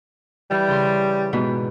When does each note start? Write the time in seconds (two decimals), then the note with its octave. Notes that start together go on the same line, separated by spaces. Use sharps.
0.51 E3 G3
0.68 C#3 C6
1.33 G#2 B2 B3